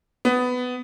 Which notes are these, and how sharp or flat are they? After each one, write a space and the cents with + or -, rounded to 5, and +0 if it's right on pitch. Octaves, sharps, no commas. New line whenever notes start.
B3 +15